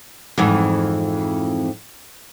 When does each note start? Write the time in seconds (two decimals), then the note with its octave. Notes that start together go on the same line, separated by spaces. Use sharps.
0.38 F2 G#2 E3